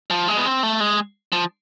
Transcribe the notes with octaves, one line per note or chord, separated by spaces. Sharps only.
F3
G#3
B3
C4
A3
G#3
F3